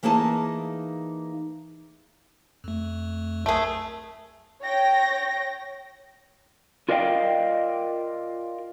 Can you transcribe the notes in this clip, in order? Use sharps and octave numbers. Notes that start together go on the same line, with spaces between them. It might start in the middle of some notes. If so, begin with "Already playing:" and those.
E3 A#3 D#4 G#4 A5
F2 A3
B1 A3 G#4 A#4 D#6
C#5 G5 A#6
F4 A#4 D5 D#5 F5 G5